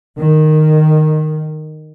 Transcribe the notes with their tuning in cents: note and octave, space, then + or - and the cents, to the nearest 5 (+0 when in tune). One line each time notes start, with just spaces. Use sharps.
D#3 -10